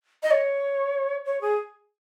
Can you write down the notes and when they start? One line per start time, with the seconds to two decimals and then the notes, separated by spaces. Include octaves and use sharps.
0.23 D#5
0.31 C#5
1.25 C#5
1.41 G#4